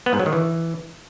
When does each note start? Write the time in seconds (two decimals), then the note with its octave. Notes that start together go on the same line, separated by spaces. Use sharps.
0.06 B3
0.13 G#2
0.19 F#3
0.26 D#3
0.33 E3